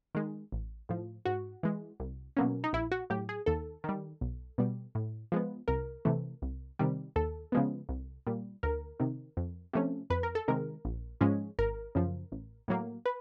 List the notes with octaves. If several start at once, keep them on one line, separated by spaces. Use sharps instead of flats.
D#3 G#3
A1
A2 F3
G#2 F#4
E3 G#3
C2
B2 F#3 A#3 C#4
D#4
A#1 E4
F#4
A2 F#3 G4
G#4
D#2 A4
D#3 G3
B1
B2 G3
A2
F3 G#3 B3
C2 A#4
C3 E3 A3
C2
C3 D#3 G3
D#2 A4
C#3 F3 G#3 B3
C2
A#2 G3
D2 A#4
C3 D#3
F2
C3 F3 A3 C#4
F2 B4
A#4
A4
C3 D#3 G#3 A#4
A#1
G#2 F3 G#3 C#4
G#1 A#4
F#2 C#3 F3
A1
A2 F#3 A#3
B4